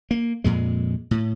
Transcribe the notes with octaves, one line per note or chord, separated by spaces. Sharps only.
A#3
F2 A#2 G#3
A2